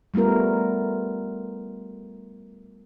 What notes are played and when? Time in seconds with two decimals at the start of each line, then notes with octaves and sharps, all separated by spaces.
0.14 G3 A3 B3 F4 A#4